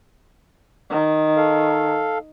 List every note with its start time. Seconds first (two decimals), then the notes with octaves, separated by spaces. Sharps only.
0.90 D#3
1.37 A4 F5